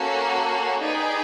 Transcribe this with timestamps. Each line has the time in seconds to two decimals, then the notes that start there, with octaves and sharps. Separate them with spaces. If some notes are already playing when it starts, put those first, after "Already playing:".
Already playing: A#3 C#4 F#4 A4
0.80 D#4 G#4 B4 D5 G5